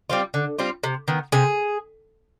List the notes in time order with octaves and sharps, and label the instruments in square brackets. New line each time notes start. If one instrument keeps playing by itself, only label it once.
[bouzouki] G3 C4 F4
D3
G3 C4 F4
C3
D#3 B3
C3 G#4